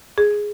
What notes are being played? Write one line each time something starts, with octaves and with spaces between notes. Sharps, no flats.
G#4